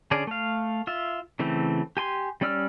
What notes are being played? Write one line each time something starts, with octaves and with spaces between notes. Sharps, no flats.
D3 C#4 G#4 D5
A3 F5
F4 E5
C#3 E3 A3 C4
G4 G#5 C6
G3 C#4 D5 E6 F6